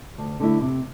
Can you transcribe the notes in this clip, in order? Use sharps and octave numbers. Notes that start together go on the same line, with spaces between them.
D2
D3 A3 E4
C3